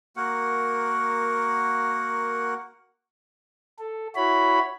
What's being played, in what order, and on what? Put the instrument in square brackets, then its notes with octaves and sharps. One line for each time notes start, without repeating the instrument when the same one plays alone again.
[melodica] A#3 F#4 A#4 F#5
[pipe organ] A4
E4 F#4 C#5 B5